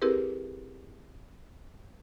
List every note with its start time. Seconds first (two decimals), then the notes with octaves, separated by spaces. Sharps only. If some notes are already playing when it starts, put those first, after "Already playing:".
0.02 C4 E4 G4 G#4 A#4 B4